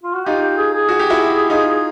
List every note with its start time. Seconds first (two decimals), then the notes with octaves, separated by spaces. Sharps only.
0.03 F4
0.15 F#4
0.26 D#4 F4 G4
0.42 G4
0.57 G#4
0.73 G#4
0.89 F#4
0.99 G4
1.10 E4 F#4
1.50 D#4 F4